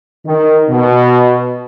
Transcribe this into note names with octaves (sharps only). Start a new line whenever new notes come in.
D#3
B2